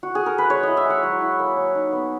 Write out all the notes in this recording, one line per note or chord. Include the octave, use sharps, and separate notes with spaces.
F#4
G#4
A#4
B4
G#3 C#5
E4 D#5
E5
G#3 F#5
F#3
E4
A#3
F#3
D#4
B3